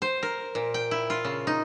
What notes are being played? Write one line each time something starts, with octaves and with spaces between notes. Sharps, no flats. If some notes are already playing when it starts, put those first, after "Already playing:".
C5
A#4
A#2
G5
E4
F4
C#3
D#4